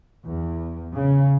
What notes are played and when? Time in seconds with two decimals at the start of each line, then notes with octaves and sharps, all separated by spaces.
0.23 E2
0.93 C#3